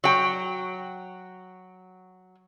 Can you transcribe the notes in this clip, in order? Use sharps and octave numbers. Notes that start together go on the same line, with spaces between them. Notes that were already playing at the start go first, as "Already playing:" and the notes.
F#3 G5